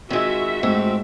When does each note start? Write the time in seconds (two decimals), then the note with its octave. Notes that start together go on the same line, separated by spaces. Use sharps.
0.10 D#3 G#3 C4 F4 F#4 E5
0.63 G#2 A3 C4